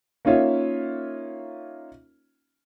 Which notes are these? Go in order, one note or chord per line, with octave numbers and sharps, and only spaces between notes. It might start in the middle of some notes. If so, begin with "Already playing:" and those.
A#3 C#4 D#4 F4 C#5 E5